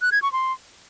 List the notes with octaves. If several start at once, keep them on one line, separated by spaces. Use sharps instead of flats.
F#6
G#6
C#6
C6